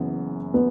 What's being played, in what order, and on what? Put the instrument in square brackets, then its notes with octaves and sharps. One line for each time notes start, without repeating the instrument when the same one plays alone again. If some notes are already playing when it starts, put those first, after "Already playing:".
Already playing: [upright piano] F#1 F#2 E3 B3
[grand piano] B3